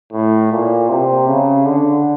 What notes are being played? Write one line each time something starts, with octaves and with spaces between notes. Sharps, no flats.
A2
A#2
C3
C#3
D3